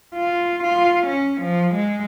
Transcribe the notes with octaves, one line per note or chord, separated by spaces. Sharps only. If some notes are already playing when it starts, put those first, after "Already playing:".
F4
F4
C#4
F3
G#3